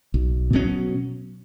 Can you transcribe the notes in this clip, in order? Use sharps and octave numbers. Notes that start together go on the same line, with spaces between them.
B1
B2 F#3 C#4